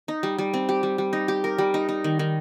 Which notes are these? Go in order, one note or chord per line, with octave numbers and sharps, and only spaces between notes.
D#4
G3
G3
C4
G4
G3
G3
D#4
G4
A#4
G3
D#4
D#4
D#3
D#3